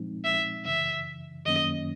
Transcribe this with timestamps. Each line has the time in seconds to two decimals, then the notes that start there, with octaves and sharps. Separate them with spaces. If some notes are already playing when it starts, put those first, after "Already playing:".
Already playing: A#2 F3 G#3 C4 D#4
0.25 E5
0.65 F#2 C#3 E3 E5
1.46 F#2 D#3 F#3 A#3 C#4 D#5